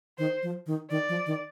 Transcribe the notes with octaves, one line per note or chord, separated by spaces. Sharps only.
D#3 C5
F3
D#3
D#3 D5
F3
D#3